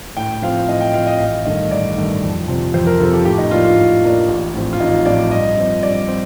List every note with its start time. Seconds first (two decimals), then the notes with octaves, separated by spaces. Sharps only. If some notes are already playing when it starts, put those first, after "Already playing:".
0.17 A2 G5
0.42 F3 C4 F5
0.68 A2 D#5
0.81 G5
0.94 F3 C4 F5
1.07 D#5
1.20 A1 F5
1.45 G2 D#3 A3 D#5
1.71 A1 D5
1.97 G2 D#3 A3
2.23 F2
2.48 C3 F3 C4
2.74 F2 C5
2.87 A#4
3.00 C3 F3 C4 A4
3.13 G4
3.25 A2 G4
3.38 D#4
3.51 F3 A#3 D4 F4
3.64 F4
3.77 A2
4.03 F3 A#3 D4
4.28 A1
4.54 A2 F3 C4
4.73 F4
4.80 A1 D#4
5.05 A2 F3 C4 D5
5.31 G2 D#5
5.57 F3 C4
5.83 G2 D5
6.08 C4